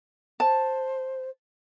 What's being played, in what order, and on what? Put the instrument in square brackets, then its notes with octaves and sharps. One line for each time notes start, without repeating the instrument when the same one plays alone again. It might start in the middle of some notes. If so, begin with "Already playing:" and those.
[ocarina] C5 [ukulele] A5